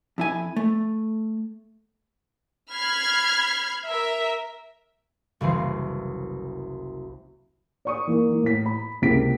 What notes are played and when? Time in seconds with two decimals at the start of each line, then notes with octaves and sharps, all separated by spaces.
0.18 F2 E4 G#5
0.56 A3
2.72 B5 F6 G#6 C7
3.84 A#4 E5
5.41 F#1 C2 E3 C4 C7
7.85 D5 C#6 D#6
8.07 E3 A#3
8.29 E3 A#3
8.43 A2 B6
8.66 B5
9.02 C#2 C3 A#3 E4 B6 D7